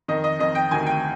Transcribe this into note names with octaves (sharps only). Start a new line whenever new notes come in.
F2 D#3 D#5
D#5
F2 D#3 D#5
G5
D2 C3 D#3 G#5
G5